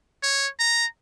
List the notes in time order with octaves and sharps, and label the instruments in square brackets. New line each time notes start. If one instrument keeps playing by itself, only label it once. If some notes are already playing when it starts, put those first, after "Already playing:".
[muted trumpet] C#5
A#5